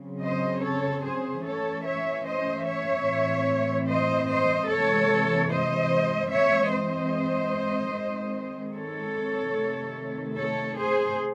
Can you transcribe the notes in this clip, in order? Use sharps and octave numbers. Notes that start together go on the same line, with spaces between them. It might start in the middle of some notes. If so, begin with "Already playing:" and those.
Already playing: C#3 F#3 C4
C5 D#5
A4 C#5
G#4 C5
E3 A3 C#4 A4 C#5
C#5 E5
C5 D#5
C#5 E5
A2 E3 C4
C5 D#5
C5 D#5
C3 E3 G#3 A4 C#5
C5 D#5
E3 G#3 C4 C#5 E5
C5 D#5
D#3 G#3 C4
A4 C#5
C3 D#3 A3
A4 C#5
G#4 C5